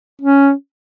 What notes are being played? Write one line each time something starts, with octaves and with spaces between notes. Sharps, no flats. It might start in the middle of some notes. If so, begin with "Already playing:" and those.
C#4